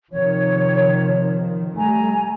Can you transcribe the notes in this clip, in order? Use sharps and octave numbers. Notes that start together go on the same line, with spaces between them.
C3 D#3 F3 C#5
G3 A3 G#5 A#5